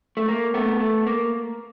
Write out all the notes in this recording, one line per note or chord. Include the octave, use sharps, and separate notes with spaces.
A3
A#3
A3 B3
A3
A#3